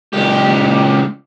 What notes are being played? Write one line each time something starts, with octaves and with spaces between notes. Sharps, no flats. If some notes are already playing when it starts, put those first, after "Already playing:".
C#2 G4